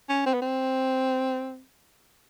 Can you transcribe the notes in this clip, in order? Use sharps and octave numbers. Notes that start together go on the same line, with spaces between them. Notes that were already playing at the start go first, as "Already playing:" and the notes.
C#4
C4
B3
C4